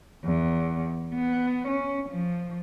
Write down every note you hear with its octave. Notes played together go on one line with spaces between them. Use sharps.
E2
B3
C#4
F3